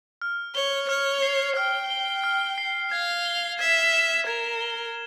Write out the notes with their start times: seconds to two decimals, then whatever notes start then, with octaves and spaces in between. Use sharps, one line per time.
0.22 F6
0.55 C#5 G7
0.89 C#5 F6
1.22 C7
1.57 G5 F6
1.90 G7
2.24 F6
2.58 C7
2.91 F5 G#6
3.25 G7
3.59 E5 G#6
3.93 E7
4.27 A#4 G#6
4.60 G7